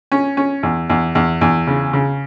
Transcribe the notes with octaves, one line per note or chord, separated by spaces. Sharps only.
C#4
C#4
E2
E2
E2
E2
C#3
C#3